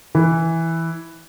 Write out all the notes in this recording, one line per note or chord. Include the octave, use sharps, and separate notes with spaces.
E3